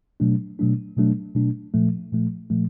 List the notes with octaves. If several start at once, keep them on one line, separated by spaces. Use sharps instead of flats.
B2 F#3 A3 D4
B2 F#3 A3 D4
B2 F#3 A3 D4
B2 F#3 A3 D4
A#2 F3 A3
A#2 F3 A3
A#2 F3 A3